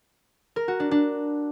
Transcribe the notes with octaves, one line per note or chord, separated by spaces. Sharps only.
A#4
F#4
D4
D4